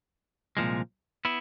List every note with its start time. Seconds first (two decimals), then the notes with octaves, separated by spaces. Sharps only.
0.57 C2 A#2 F3 G#3
1.25 B3 E4